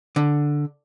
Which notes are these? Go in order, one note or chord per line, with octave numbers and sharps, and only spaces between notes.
D3